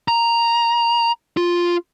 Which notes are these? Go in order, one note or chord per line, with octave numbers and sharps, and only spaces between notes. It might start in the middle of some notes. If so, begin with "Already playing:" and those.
A#5
F4